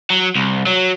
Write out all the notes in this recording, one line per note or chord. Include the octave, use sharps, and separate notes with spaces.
F#3
C2
F#3